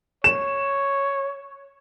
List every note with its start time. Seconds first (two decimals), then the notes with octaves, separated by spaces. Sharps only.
0.24 C#5 E7